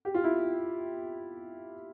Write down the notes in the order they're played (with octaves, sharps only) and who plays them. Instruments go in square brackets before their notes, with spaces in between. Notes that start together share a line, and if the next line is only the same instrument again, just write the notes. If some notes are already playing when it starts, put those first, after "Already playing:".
[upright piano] G4
F4
E4